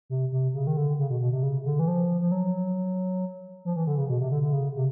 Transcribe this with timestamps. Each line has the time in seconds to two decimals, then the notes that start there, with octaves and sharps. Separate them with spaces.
0.10 C3
0.32 C3
0.54 C#3
0.67 D#3
0.77 D3
0.99 C#3
1.10 B2
1.21 B2
1.32 C3
1.43 C#3
1.65 D3
1.79 E3
1.88 F3
2.21 F3
2.32 F#3
3.65 F3
3.76 E3
3.87 D3
3.97 C#3
4.09 B2
4.21 C3
4.32 D3
4.42 D3
4.53 C#3
4.76 C3